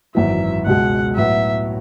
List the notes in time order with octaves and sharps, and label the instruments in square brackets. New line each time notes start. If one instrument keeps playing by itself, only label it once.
[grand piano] G#1 F#2 E3 [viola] E5
[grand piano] C#2 B2 G#3 [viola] F#5
[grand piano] A2 F#3 B3 F#4 [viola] E5